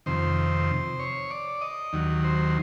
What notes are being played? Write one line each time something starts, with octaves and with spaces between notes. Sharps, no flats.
F2 C3 D#3 C5
C#5
D5
D#5
D#2 D#3 F#3
C5